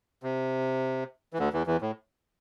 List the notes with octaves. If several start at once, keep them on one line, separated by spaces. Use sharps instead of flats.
C3
E3
D2 D3
E2 E3
E2 E3
A2